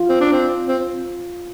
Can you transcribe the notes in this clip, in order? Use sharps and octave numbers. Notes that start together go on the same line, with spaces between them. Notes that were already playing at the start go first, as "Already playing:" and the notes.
Already playing: F4
C4
D4
C4
C4